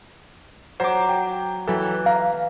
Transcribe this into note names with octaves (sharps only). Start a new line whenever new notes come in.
F#3 C5 D6
G5
E3 F#3 A4
F5 A#5